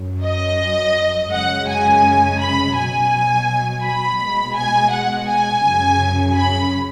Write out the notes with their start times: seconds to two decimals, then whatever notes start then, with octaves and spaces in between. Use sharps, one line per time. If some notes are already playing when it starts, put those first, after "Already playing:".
Already playing: F#2 F#3
0.23 D#5
1.31 F#2 C#3 G#3 F#5
1.67 G#5
2.39 B5
2.75 B2 F#3 G#5
3.83 B5
4.19 B2 G#3
4.56 G#5
4.92 F#5
5.27 G#5
5.64 F#2 C#3 F#3
6.35 B5